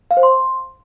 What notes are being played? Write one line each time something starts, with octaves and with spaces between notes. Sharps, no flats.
F5
C5
C6